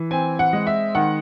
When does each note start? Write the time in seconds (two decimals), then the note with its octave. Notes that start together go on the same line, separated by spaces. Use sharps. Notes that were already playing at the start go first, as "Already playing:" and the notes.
Already playing: E3
0.11 C4 G#5
0.39 F#5
0.53 G#3
0.67 E5
0.95 D#3 F#5